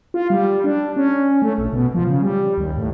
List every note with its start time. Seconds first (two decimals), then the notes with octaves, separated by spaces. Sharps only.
0.14 F4
0.30 G3
0.64 D4
0.96 C#4
1.42 A3
1.58 A#1
1.73 B2
1.94 F3
2.07 C#3
2.22 G3
2.58 D#2
2.77 A2